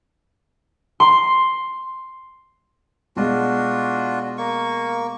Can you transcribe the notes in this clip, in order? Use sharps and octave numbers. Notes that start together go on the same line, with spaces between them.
C6
B2 G#3 D4 F4 F#4
A#3 C#6